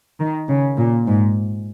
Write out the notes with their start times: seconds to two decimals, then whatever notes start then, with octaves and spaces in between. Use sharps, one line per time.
0.20 D#3
0.49 C#3
0.79 A#2
1.07 G#2